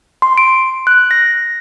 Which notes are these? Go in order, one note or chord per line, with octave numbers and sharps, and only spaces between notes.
C6
D7
F#6
A#6